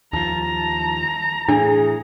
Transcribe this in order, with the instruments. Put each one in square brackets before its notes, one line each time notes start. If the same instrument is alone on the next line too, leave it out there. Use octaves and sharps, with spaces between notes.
[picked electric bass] D#2 F3 [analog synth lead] A5 [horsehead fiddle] A#5
[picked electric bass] A2 E3 [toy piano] D4 [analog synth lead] G#4